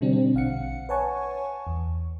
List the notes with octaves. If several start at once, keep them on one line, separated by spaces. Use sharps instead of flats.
B2 D3 G3 C4 D4
C4
A#1 F5 F#5 C#7
B4 C#5 F#5 G#5 A5 C#6
E2